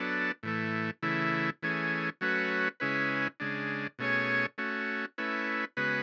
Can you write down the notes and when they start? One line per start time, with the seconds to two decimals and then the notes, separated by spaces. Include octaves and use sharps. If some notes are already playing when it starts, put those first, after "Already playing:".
Already playing: F#3 B3 D4 A4
0.43 A2 E3 A3
1.03 C#3 E3 A3 E4
1.63 E3 A3 C#4 G#4
2.21 F#3 A3 C#4 F#4 B4
2.80 C#3 G#3 C#4 E4 B4
3.40 C#3 G#3 D4
3.99 B2 A3 C#4 G#4 C#5
4.58 A3 C#4 F#4
5.18 A3 C#4 E4 B4
5.77 C#3 G#3 B3 F#4 B4